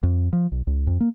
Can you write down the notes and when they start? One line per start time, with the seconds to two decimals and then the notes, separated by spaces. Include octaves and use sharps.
0.03 F2
0.33 F3
0.52 B1
0.67 C#2
0.87 F2
1.00 A#3